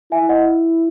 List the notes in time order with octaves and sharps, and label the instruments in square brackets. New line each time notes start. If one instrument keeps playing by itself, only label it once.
[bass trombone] E4 [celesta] E5 G#5
[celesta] D#5 F#5